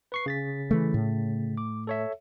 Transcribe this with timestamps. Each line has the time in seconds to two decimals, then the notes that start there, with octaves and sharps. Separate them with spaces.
0.12 B4 C#6 C7
0.26 C#3 A6 B6
0.71 E3 A3
0.94 A2
1.57 D6
1.87 A4 C#5 E5